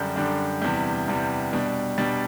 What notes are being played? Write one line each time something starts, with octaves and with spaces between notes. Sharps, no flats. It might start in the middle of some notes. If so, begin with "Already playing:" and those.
Already playing: F#2 D3 G3 D4 G6
F#2 D3 G3 D4
E2 C3 G3 G6
E2 C3 G3
B2 G3 D4
B2 G3 D4 A6